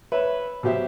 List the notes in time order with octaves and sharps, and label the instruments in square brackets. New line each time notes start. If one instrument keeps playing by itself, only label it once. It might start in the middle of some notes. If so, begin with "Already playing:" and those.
[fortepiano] B4 C#5 E5
B2 F#3 G4 C5 E5